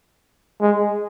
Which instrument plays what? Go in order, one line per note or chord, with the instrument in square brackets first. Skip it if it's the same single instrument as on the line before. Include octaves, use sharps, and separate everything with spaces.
[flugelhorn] G#3